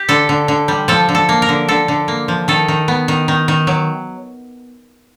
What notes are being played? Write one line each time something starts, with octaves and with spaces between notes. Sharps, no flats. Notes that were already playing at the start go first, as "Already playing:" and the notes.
Already playing: G4
D3 A4
D3
D3
G3
F3 A4
D3
A4
A#3
A#4
D3
D3 A4
D3
A#3
F3
D#3 A4
D#3
B3
D#3
D#3
D#3
F#3